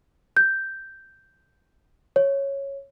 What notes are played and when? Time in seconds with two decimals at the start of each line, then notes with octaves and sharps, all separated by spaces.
0.37 G6
2.16 C#5